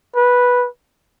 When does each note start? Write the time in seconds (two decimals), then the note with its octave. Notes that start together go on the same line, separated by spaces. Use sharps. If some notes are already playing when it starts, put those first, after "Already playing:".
0.16 B4